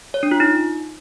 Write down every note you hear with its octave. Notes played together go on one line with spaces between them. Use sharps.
C#5
D4
F4
D#4